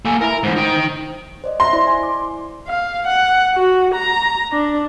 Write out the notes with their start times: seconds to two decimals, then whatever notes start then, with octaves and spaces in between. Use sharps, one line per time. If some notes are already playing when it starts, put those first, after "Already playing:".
0.05 A#3 A4 G#5
0.21 E4 A#4 A#5
0.43 G#2 E3 C5
0.56 D#4 G5
1.44 C5 D5 D#5
1.60 E5 C6 A#6
1.73 E4 C5 D5
1.87 G#5
2.03 D6
2.67 F5
3.07 F#5
3.55 F#4
3.95 A#5
4.52 D4